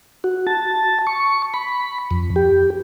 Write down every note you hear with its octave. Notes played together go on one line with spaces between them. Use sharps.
F#4
A5
C#6
B5
F2
G4